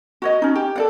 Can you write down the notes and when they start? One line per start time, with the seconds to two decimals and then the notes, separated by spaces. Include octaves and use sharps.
0.22 F#4 C#5 D#5
0.42 C#4 D#4
0.56 G4
0.76 A4 D5 F#5